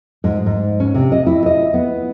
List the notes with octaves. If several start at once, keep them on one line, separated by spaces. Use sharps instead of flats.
G#2
G#2
C#4
C3
D#5
E4
D#5
B3